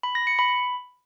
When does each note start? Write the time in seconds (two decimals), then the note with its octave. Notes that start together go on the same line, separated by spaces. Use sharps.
0.03 B5
0.15 A#6
0.27 C#7
0.39 B5